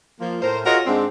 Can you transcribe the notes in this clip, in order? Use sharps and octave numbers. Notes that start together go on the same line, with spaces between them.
F3 A#3
A2 A#4 C5
F4 F#4 G#4 A#4 C#5 D#5
G#2 C4 D4